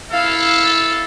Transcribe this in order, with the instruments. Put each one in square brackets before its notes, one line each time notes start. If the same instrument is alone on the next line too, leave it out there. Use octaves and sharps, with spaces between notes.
[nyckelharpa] E4 F5 [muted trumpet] A4